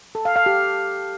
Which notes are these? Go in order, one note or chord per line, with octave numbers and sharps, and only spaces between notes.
A4
F5
F5
G4